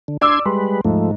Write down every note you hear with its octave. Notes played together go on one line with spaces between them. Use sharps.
D3
D4 D5 C6 D6 E6 G#6
G3 G#3 B4 C6
G#2 F3 A3